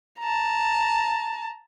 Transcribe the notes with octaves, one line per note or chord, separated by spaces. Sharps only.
A5 A#5